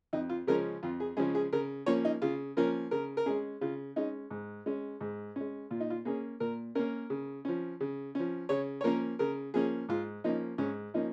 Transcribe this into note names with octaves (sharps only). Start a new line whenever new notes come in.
F2 D#4
F4
C#3 F3 G#3 C#4 A#4
F2 F4
G#4
C#3 F3 G#3 C#4 G#4
G#4
C#3 A#4
F3 A#3 C#4 C#5
D#4
C#3 F4
F3 A#3 C#4 A#4
C#3 A#4
A#4
G#3 C#4 G#4
C#3 F4
G#3 C#4 D#4
G#2
G#3 C#4
G#2
G#3 C#4
A#2 F4
D#4
F4
A#3 C#4 G#4
A#2 A#4
A#3 C#4 A#4
C#3
F3 C#4
C#3
F3 C#4
C#3 C#5
C#5
F3 A#3 C#4 A#4
C#3 A#4
F3 A#3 C#4 G#4
G#2 F4
F3 A#3 C#4 D#4
G#2 C#4
F3 A#3 C#4 D#4